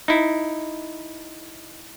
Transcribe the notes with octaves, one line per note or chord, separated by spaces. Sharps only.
D#4 E4